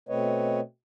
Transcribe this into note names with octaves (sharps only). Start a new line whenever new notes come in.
B2 A3 C4 B4 C#5 D#5